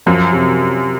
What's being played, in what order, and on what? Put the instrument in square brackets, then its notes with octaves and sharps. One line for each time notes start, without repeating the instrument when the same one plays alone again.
[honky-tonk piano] F#2 [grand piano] F3
[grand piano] C3